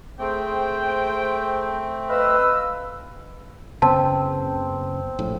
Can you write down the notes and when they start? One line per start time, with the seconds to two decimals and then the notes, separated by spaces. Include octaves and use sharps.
0.19 A3 C4 G#4 C5 G5
2.10 B4 D#5 F5 E6
3.82 F#1 C#3 B3 C4 A5
5.19 A#1 A2